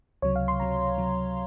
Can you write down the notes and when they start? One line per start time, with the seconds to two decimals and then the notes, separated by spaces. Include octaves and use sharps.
0.22 C#2 C3 F#3 C#5
0.36 F5
0.48 C6
0.60 C#2 C3 F#3 A#5
0.98 C#2 C3 F#3